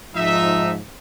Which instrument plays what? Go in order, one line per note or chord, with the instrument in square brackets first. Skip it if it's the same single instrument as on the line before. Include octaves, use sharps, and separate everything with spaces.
[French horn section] G#2 F3 [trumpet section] D#4 E5